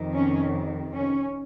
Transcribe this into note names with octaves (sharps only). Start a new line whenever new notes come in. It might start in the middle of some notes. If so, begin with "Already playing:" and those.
Already playing: F2 C3 D#3
C#4
C#4